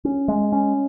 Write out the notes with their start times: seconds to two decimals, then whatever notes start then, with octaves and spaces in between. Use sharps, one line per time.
0.05 C#4
0.28 G#3
0.52 C#4